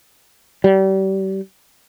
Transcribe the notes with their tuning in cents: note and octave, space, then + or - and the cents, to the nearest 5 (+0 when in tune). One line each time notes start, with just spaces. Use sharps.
G3 -35